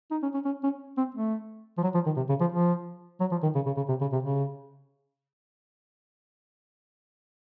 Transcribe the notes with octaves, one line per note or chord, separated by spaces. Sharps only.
D#4
C#4
C#4
C#4
C#4
C4
A3
F3
F#3
F3
D#3
C3
C#3
F3
F3
F#3
F3
D#3
C#3
C#3
C#3
C3
C#3
C3
C#3